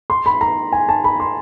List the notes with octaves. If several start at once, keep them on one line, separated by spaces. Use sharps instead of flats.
C6
B5
A#5
G#5
A5
B5
C6